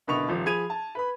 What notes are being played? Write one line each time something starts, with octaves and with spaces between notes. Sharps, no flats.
F#1 B2 D3 B5 C#6 F7
D#1 F3
F3 G#4 B5 G#6 D#7 F7
A5
B4 B5